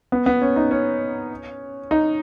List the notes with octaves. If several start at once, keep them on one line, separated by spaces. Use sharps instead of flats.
B3
B3
C#4
D#4
C#4
D#4